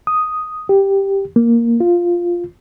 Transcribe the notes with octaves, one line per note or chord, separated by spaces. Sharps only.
D#6
G4
A#3
F4